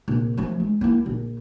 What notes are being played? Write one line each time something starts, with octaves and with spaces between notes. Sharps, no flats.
A#1 C3
F3 A3
G#3
A#3 E4
A#1